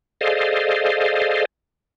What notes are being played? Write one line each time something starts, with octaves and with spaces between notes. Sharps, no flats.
G#4 A4 C5 D5 D#5 F5